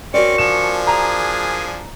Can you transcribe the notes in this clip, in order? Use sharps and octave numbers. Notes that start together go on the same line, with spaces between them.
C4 C#4 F#4 A#4 D5 C#6
F3 D4 G#5 E7
G#4 A#5